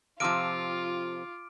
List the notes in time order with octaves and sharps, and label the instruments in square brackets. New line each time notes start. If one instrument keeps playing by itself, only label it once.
[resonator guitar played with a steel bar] F2 C3 F3 [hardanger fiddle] F4 [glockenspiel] D6 F6 D7